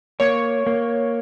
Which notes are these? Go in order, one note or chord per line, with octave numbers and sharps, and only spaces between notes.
A#3 C#5
A#3